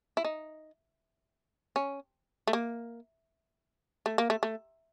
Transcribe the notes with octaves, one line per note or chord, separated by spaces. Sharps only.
E4
D#4
C#4
A3
A#3
A3
A#3
A3
A3